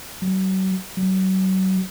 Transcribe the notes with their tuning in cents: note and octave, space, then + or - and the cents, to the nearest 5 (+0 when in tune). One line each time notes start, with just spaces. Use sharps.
F#3 +40
F#3 +35